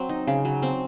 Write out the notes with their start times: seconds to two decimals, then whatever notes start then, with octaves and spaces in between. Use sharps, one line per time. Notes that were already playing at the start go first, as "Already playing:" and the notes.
Already playing: F#3 C4
0.09 D#4
0.27 C#3
0.45 F#3
0.62 C4